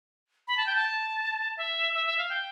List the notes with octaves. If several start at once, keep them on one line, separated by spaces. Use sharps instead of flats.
B5
A5
G5
A5
E5
E5
E5
F5
G5